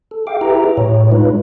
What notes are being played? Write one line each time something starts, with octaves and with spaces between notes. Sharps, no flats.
A4
G#4 E5 F5 G5 D6
E4 G4 G#4 B4 E5 A#5
A2 C#5
G#3 D#4 F4 B4